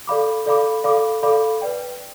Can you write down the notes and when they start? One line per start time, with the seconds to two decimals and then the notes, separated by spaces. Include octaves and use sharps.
0.07 A4 D5 F5 B5 D6
0.46 A4 D5 F5 B5 D6
0.84 A4 D5 F5 B5 D6
1.23 A4 D5 F5 B5 D6
1.62 B4 D5 G5